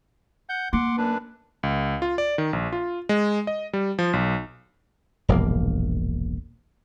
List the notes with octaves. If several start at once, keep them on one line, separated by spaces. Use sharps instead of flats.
F#5 G6
A#3 F#5 C6 D6
F#2 D4 B4
C#2
F4
D5
D#3
A#1
F4
G#3
D#5
G3
F3
B1
E1 A#1 G2 A#3